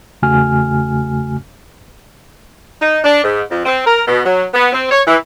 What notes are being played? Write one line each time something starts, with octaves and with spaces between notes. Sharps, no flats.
E2 C#3 A3 F#4 G#5 F6
D#4
D4
G#2
F2
C4
A#4
B2
F#3
B3
C4
C#5
E3